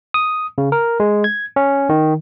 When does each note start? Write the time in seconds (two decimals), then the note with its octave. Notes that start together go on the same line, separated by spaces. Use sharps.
0.14 D#6
0.58 C#3
0.72 A#4
1.00 G#3
1.24 G#6
1.56 C#4
1.89 D#3